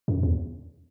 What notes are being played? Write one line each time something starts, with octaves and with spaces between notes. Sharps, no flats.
F#2
E2